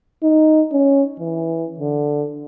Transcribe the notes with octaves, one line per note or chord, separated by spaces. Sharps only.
D#4
C#4
E3
D3